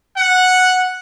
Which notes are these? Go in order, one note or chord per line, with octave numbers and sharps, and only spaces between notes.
F#5